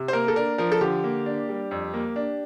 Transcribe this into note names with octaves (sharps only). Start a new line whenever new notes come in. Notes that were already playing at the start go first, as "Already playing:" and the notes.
Already playing: C3
C5
A#3 A#4
A4
D4 A#4
F3 A#4
A4
D3 G4
A#3
D4
G3
F2
A#3
D4